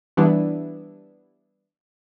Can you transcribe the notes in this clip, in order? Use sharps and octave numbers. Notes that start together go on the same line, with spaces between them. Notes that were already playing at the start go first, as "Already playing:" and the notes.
E3 G3 B3 D4 E4